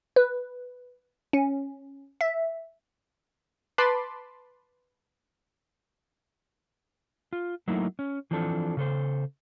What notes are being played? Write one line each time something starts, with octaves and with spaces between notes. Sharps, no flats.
B4
C#4
E5
B4 A5 B5 C6 D6
F4
F#3 A3 A#3 D#4 E4
C#4
E3 F3 C4 D4 A4
C#3 A4 C5